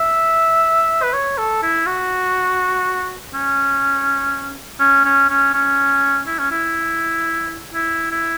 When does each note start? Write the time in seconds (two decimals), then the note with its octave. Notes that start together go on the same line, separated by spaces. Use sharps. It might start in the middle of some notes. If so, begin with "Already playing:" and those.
Already playing: E5
1.03 B4
1.14 C#5
1.38 A4
1.63 E4
1.86 F#4
3.34 C#4
4.80 C#4
5.04 C#4
5.29 C#4
5.54 C#4
6.27 E4
6.39 C#4
6.51 E4
7.74 E4
8.11 E4